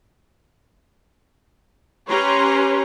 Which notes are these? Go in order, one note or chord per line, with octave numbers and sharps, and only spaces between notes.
C#4 G4 B4 C#5 A#5 C6